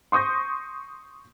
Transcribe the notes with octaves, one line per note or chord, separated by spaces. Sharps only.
C6 C#6 D#6 G6 A#6